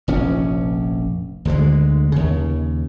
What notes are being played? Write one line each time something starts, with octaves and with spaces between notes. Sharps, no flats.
F1 A#1 C#4
D2 D3 G#3
D#2 C#3